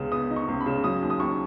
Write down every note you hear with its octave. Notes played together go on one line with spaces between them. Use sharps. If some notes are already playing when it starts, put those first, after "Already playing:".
Already playing: C#2 C#3 B3
B3 D#6
D#4
C#6
C#2
B5
C#3
F#3 D#6
D#2
D#6
D#2 C#6